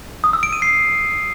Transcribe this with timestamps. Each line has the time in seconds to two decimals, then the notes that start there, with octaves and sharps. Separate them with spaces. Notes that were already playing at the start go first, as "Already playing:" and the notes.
0.24 D#6
0.33 E6
0.43 D7
0.53 D#7
0.62 C7